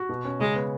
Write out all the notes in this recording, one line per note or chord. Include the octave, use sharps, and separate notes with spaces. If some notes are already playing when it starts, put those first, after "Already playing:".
Already playing: F#4
B2
C#4
C#3 G#3
B3